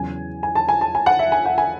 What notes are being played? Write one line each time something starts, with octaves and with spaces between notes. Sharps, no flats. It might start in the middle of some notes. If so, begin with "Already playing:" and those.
Already playing: E2 C#3 F#3 C#4 G#5
G#5
A5
G#5
A5
G#5
F#5
E5
G#5
F#5
G#5